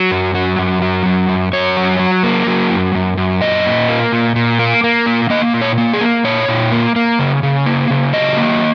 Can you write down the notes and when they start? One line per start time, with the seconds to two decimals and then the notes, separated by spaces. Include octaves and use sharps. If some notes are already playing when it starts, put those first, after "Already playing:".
Already playing: F#3
0.11 F#2
0.34 F#3
0.59 F#2
0.82 F#3
1.06 F#2
1.29 F#2
1.53 F#2 C#5
1.77 F#3
1.99 F#3
2.23 A#3
2.47 F#3
2.70 F#2
2.95 F#2
3.17 F#2
3.41 A#2 D#5
3.65 A#2
3.88 A#3
4.13 A#2
4.36 A#2
4.59 A#3
4.84 A#3
5.06 A#2
5.30 A#3 D#5
5.54 A#2
5.61 C#5
5.78 A#3
5.93 G#4
6.01 A#3
6.24 A#2 C#5
6.48 A#2
6.72 A#3
6.96 A#3
7.19 C#3
7.43 C#3
7.66 A#3
7.90 C#3
8.13 F#3 D#5
8.37 A#3